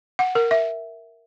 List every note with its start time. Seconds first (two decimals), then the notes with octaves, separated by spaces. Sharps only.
0.19 F#5
0.35 A#4
0.51 E5